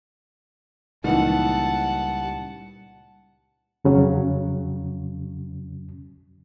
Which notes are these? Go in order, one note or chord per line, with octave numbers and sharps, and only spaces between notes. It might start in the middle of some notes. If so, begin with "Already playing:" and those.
C#2 A#2 D#3 E3 G3 F#5 A5
F2 C#3 F#3 C#4